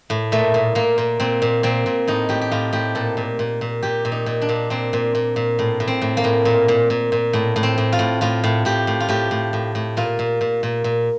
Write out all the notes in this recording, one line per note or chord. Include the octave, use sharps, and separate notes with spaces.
A2
A#2 A3
A#2
A#2 A#3
A#2
A#2 C4
A#2
A#2 C4
A#2
A2 D#4
A2 G4
G4
A2 F4
A2 G4
A#2 A4
A#2
A#2
A#2
A#2 G4
A#2
D#4
A#2
D4
A#2
A#2 C4
A#2
A#2
A#2
A2
A2
C4
A2
A#3
A2
A#2
A#2
A#2
A#2
A2
A2
C4
A2
F4
A2
A2 F4
A2
A2 G4
A2
F4
A2 G4
A2
A2
A2
A#2 F4
A#2
A#2
A#2
A#2